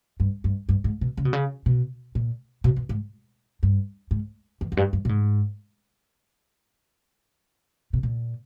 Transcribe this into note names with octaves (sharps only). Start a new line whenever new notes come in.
G2
G2
G2
G#2
B2
C#3
B2
C#3
B2
A#2
B2
B2
G#2
G2
G#2
E2
E2
G2
G2
A#2
G#2
B2
A#2